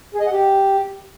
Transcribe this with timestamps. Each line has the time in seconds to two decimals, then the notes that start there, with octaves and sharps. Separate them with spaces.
0.14 G#4
0.20 D#5
0.26 F#5
0.32 G4